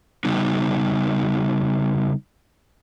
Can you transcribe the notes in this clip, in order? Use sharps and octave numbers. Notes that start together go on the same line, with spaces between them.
C#3 G3 B3 D#4